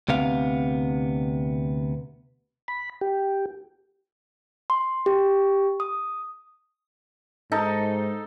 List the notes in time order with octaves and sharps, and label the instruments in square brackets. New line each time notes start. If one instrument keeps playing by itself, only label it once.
[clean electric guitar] D2 C3 B3 F5
[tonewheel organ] B5
G4
[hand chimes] C6
G4
D#6
[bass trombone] G#2 [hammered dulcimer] D#4 A4